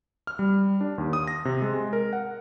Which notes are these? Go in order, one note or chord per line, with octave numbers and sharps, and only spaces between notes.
F6
G3
D4
D#2
D#6
A#6
C3
G#3
A#4
F#5